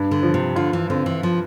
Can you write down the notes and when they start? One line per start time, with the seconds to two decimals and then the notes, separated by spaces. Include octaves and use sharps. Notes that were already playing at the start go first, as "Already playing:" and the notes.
Already playing: G2
0.11 D3
0.23 F3
0.34 C3
0.56 D3 F4
0.73 E3
0.90 D3 C4
1.06 E3
1.23 F3